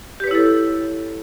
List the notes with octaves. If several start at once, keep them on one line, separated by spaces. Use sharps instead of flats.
E4 G4 A4 B4 C#5